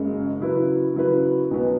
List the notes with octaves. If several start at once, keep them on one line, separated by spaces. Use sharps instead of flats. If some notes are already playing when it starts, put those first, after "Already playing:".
Already playing: F#1 F#2 C#3 G#3
C#3 F#3 E4 B4
C#3 F#3 E4 B4
B1 B2 F#3 B3